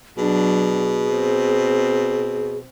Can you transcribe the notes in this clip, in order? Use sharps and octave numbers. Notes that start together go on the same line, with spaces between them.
B2 F#3 D4 G#4
C4